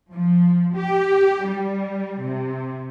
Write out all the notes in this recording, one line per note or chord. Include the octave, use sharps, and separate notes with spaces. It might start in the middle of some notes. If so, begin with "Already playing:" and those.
F3
G4
G3
C3